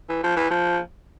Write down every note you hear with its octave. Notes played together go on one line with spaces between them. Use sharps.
E3
F3
E3
F3